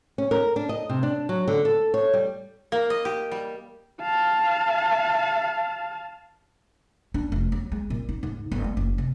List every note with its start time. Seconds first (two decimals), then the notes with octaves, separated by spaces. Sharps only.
0.18 C#4
0.31 A#4
0.56 D4
0.69 D#5
0.89 C3
1.03 D4
1.29 F#3
1.47 D3
1.65 A4
1.94 C#5
2.13 G3
2.72 A#3
2.90 D#5
3.05 G4
3.32 G3
4.01 F5 A5
7.14 D4
7.32 F1
7.52 F#3
7.72 G#3
7.90 A#2
8.09 D#4
8.23 G#2
8.52 G1
8.64 G#3
8.77 F#1
8.98 C3